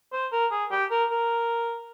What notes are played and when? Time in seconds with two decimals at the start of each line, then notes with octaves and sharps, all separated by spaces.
0.13 C5
0.32 A#4
0.51 G#4
0.71 G4
0.91 A#4
1.10 A#4